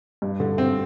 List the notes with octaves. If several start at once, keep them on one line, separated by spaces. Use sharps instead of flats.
G2
D3
C4